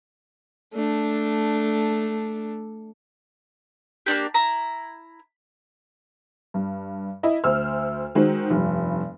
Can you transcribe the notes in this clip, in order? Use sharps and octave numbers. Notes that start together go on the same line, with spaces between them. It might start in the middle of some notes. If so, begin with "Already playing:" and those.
A3 D4
A#3 C4 D4 G4
E4 A#5
G2
E4 D#5
D2 C5 E6 F6
D#3 G#3 F#4 C5
F1 G2